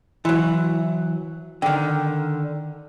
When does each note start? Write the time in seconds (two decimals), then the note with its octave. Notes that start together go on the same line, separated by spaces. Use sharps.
0.25 E3 F#3 E4
1.62 D3 D#3 G5